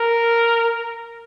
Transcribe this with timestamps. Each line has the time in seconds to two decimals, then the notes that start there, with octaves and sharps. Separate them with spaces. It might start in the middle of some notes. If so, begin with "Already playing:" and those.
Already playing: A#4